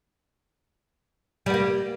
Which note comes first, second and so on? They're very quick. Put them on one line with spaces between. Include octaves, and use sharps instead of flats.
G3 B3 A#3